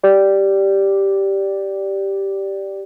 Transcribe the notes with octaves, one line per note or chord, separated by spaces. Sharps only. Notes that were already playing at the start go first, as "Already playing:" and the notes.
G4 D5